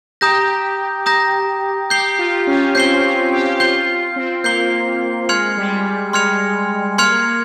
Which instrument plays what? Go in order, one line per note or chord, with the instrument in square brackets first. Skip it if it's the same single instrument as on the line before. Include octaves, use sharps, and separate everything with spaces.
[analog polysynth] G4 [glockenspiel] A#5 D#6 G6 A#6
[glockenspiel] A#5 D#6 G6 A#6
[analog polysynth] G4 [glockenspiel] G6 C7 G7
[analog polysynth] F4
C#4
[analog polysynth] C4 [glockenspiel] G6 C7 G7
[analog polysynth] C#4
G4
[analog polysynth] F4 [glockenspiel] G6 C7 G7
[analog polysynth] C4
[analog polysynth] A#3 [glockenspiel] G6 C7 G7
[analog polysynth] G#3 [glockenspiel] C6 F6 G#6 C#7 F7
[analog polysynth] G3
[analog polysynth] G#3 [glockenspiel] C6 F6 G#6 C#7 F7
[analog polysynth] A#3 [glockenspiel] C6 F6 G#6 C#7 F7